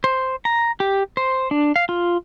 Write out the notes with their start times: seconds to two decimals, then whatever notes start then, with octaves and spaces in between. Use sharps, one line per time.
0.04 C5
0.45 A#5
0.80 G4
1.17 C5
1.51 D4
1.76 F5
1.89 F4